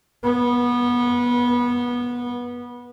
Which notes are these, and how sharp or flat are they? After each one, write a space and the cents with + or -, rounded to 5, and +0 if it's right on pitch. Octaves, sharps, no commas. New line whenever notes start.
B3 -20